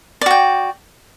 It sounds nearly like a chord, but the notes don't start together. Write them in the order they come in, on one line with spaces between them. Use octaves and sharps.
D5 F#4 G5